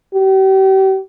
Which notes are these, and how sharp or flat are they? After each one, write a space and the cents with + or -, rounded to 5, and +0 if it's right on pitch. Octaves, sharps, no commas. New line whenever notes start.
G4 -40